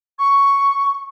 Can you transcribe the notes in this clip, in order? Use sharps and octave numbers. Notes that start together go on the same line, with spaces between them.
C#6